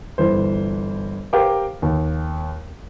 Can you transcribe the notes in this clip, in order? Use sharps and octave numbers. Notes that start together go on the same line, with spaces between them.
G1 E3 C5
G4 A#4 C5 F5 G5 D6
D#2